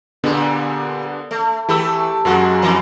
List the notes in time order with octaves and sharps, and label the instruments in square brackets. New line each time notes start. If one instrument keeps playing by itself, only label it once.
[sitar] A#2 G3 [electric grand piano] D3 B3 D4
[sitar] A3
[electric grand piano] E3 B5 E6 [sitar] A3 G4
[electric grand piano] F#2 F#3 F#4 [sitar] G#3 A#3
[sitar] E2 E3 A#3